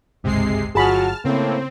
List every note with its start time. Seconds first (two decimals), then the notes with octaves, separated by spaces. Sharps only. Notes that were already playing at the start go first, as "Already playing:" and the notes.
0.24 G1 C#2 G#2 C3 G#3 C7
0.75 G1 F#3 F4 F#4 G#4 A5 B5 F6
1.25 A2 C#3 A#3 C4